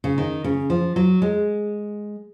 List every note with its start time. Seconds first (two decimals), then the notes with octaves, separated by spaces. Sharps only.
0.04 C#3
0.18 D#3
0.44 C#3
0.70 F3
0.96 F#3
1.22 G#3